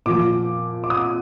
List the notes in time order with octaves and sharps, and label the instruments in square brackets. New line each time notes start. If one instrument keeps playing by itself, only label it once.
[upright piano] A#2 F3 D6
D6
D#6